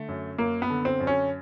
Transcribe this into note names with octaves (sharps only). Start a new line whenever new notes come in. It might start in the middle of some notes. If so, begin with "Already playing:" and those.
Already playing: D3 A3
F#2
F#2 A#3
B3
D3
C4
F#2
C#4